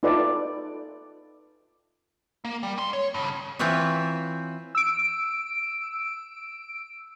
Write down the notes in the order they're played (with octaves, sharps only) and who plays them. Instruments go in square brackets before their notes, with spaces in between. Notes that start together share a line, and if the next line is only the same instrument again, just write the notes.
[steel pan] D#4 F4 A4 B4 D5 E5
[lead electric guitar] A#3
G3
C#4 C6
C#5
G2 C#3
[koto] E3 C4 F4 B4 C#5 E5
[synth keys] E6 D7